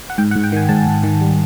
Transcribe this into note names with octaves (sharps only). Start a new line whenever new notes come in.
F#5
G#2 G5
F#5
G#2
G5
D#3 G#5
G#2 A5
G#2
D#3
G3